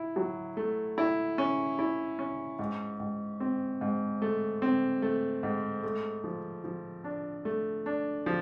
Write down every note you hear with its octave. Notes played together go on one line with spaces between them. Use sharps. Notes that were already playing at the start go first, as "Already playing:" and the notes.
Already playing: E4
F#3
A3
E4
C#4
E4
C#4
G#2
G#2
C4
G#2
A3
C4
A3
G#2
A3
F3
F3
D4
A3
D4
F3